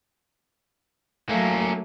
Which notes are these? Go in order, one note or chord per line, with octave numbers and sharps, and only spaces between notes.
F#3 A3 A#3 C#4